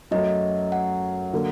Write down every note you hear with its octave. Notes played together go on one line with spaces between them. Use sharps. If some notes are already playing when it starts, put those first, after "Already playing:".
F#2 F#3 A3 D#5
F#5
D3 F#3 A#3